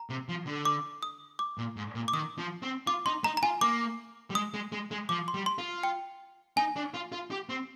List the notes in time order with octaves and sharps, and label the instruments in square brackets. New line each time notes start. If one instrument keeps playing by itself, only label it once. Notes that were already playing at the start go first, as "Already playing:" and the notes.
Already playing: [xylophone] A#5
[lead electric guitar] C3
F3
D3
[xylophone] D6
D#6
D6
[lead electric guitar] A#2
G#2
A#2
[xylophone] D6
[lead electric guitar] D#3 [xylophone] D#6
[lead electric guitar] F3
C4
[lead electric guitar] F4 [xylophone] D6
[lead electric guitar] D#4 [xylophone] C6
[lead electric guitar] D#4 [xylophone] A#5
[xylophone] A#5
[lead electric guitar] F4 [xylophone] G#5
[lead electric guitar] A#3 [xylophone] D6
[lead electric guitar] G3
[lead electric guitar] G#3 [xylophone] D#6
[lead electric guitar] G#3
G#3
G#3
[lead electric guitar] F3 [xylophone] D6
[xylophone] C6
[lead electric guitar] G3
[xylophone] C6
[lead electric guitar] F4
[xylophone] G5
[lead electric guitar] D#4 [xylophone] G#5
[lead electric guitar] D4
F4
F4
G4
C4